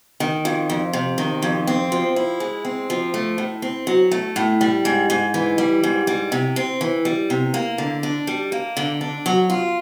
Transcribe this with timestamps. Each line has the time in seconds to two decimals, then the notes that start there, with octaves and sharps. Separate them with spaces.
0.20 D#3
0.45 F2
0.70 F2
0.93 C3
1.18 D#3
1.42 F2
1.67 C4
1.92 F3
2.16 E4
2.40 G#3
2.65 C4
2.90 F3
3.14 A3
3.38 A2
3.62 C4
3.87 F#3
4.11 A3
4.36 A2
4.61 G3
4.85 G#2
5.10 G#2
5.34 E3
5.58 G3
5.83 G#2
6.07 G3
6.32 C3
6.56 C4
6.81 E3
7.05 G3
7.30 C3
7.54 A#3
7.78 D3
8.03 D4
8.27 G3
8.52 A#3
8.77 D3
9.01 D4
9.26 F#3
9.50 F4